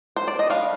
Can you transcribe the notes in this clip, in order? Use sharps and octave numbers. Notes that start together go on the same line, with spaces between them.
C5
D5
D#5
G3 D4 F5